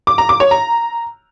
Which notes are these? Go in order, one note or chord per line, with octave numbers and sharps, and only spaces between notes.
D6
A#5
D6
C#5
A#5